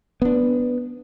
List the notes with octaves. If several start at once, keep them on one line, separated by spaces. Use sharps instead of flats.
B3 D4